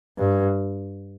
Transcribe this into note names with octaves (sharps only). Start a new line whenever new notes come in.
G2